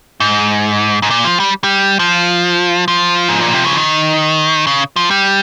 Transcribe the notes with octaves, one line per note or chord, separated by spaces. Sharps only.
G#2
G#2
A#2
F3
G3
G3
F3
F3
G#2
A#2
C3
C#3
D#3
C#3
F3
G3